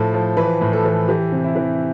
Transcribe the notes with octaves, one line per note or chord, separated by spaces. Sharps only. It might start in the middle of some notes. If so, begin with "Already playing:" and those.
Already playing: A2 F3 A4
F3
E3 B4
A2
A4
E3
E3 G4
C3
E4
E3